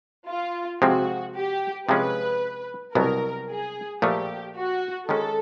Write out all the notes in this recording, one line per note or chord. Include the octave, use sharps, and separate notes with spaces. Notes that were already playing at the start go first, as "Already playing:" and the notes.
F4
C3 F3 G#3 C4 F#4
G4
C3 F3 G#3 C#4 B4
C2 B2 F#3 B3 A#4
G#4
A#2 F3 A3 G4
F#4
D#3 G#3 C#4 A4